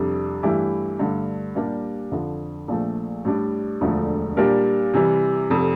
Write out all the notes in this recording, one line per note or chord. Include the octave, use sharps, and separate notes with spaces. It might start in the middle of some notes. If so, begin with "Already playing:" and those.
Already playing: F2 C3 G3 D4
G2 E3 A3 E4 G4
G2 D3 A3
A#2 G3 A#3 D4 G4
F2 D3 F3
A#1 A#2 F3 A3
A2 G3 D4
E1 D2 D3 F3 A3
A#2 G3 D4 G4 A#4
C3 E3 G3
F1 F2 C3